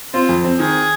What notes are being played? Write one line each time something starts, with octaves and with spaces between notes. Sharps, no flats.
C4 F4
F2
C4
D#3 G#4